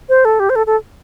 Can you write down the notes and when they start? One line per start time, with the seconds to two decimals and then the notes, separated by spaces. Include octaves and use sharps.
0.09 C5
0.25 A4
0.40 G4
0.50 C5
0.56 A4
0.66 A4